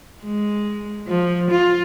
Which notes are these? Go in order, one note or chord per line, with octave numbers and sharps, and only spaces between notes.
G#3
F3
F4